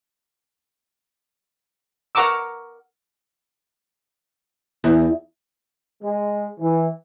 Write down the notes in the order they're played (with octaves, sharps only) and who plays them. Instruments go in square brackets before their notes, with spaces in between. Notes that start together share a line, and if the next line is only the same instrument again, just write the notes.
[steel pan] A#4 F#5 A#5 C#6 D6 E6
[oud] E2
[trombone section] G#3
E3